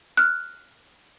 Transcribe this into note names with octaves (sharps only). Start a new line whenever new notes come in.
F6 F#6